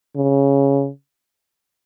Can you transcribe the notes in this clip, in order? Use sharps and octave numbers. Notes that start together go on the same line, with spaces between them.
C#3